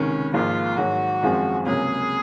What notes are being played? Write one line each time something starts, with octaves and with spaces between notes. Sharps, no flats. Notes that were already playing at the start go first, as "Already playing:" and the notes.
Already playing: C#2 C3 D#3 C#4
G#1 G#2 F3 A#3 F4
G#2 D#3 F#3 F#4
G#1 F#2 F3 G#3 C4
C#2 C3 F#3 A#3 C#4 G#4